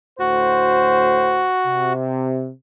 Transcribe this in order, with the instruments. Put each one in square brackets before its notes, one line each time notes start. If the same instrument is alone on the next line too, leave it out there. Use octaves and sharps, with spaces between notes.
[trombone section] D2 A2 C5 [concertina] F#4
[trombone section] C3